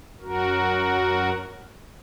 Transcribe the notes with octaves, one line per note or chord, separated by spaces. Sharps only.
F#2 F#4 A#4